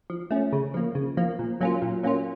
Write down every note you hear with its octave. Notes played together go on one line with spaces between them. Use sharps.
F3
A3 C#4
C#3
F3 A#3
C#3
F3 A#3
A#2
F#3 A#3 C#4 F4
A#2
F#3 A#3 C#4 F4